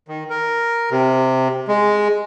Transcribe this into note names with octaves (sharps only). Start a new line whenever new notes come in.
D#3
A#4
C3
G#3